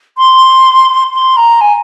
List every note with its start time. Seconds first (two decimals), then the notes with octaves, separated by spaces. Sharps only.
0.18 C6
1.14 C6
1.37 A#5
1.61 G#5